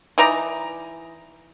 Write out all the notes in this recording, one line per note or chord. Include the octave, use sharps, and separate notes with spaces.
E3 D#4 D5 A#5